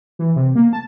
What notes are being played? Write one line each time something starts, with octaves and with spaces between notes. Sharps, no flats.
E3
C3
A#3
A5